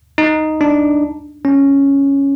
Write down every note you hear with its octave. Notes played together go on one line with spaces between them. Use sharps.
D#4
D4
C#4